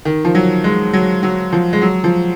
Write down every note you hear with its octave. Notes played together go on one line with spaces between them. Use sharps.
D#3
F3
F#3
G#3
F#3
F#3
F3
G#3
F#3
F3